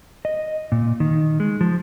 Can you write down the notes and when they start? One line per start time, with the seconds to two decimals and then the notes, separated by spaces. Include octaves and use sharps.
0.25 D#5
0.72 A#2
1.00 D#3
1.40 G#3
1.61 F3